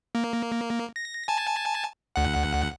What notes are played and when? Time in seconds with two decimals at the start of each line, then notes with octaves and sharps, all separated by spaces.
0.15 A#3
0.96 A#6
1.28 G#5 A5
2.16 D2 F#5